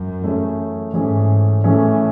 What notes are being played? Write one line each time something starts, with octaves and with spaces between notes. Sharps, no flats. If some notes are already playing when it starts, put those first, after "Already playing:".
Already playing: F#2
E3 A3 C#4 G#4
G#2 E3 A3 C#4 G#4
A2 E3 A3 C#4 G#4